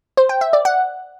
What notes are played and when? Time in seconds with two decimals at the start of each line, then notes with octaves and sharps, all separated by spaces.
0.17 C5
0.29 G5
0.41 E5
0.53 D5
0.65 F#5